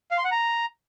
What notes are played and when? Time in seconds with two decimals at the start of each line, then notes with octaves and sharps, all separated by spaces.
0.11 F5
0.18 C6
0.25 F#5
0.31 A#5